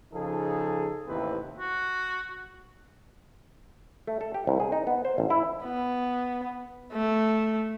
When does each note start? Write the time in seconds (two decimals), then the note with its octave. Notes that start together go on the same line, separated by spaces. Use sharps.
0.13 C#3 F3 D#4 G#4 A4
1.07 A1 D#2 C3 C4 E4 B4
1.58 F#4
4.07 A3
4.21 A4
4.34 G4
4.47 C2
4.60 G#4
4.72 D#4
4.87 B3
5.05 C5
5.18 A1
5.30 E4
5.64 B3
6.93 A3